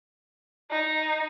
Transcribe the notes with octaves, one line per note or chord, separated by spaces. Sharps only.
D#4